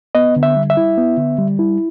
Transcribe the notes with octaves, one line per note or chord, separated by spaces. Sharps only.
B3 D#5
D3
E5
G3
E5
E4
B3
D3
G3
E4